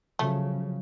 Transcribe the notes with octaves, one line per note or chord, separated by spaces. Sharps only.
C#3 F3 F#3 A3